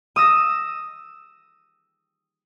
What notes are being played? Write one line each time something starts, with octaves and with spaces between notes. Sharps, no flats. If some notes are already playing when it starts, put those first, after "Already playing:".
D#6 E6 A#6